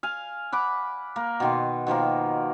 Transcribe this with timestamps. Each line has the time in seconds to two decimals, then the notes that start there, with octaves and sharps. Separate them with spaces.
0.03 F5 G#5
0.52 F#5 B5 D6
1.16 A#3
1.40 B2 D#3 C6
1.87 B2 D#3 F3 A#3